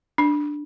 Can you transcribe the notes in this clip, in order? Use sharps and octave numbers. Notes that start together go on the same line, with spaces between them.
D4